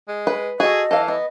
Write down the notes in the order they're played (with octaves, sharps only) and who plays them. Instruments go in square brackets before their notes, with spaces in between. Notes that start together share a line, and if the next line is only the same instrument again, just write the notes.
[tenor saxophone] G#3
[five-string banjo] B4
[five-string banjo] F#4 A4 [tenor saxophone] G#4 [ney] D#5
[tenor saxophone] E3 [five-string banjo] A4 F5
[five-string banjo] B3 [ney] D#5